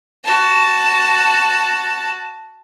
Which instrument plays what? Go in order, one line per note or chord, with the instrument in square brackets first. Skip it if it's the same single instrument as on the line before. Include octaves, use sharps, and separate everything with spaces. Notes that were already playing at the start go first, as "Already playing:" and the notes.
[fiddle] F#4 A5